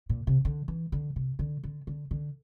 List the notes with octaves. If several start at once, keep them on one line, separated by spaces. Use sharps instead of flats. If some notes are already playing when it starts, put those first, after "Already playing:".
A#2
C3
D3
E3
D3
C3
D3
D3
D3
D3